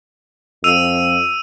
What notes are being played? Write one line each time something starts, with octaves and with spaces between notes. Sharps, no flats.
F2 E6 D#7 F7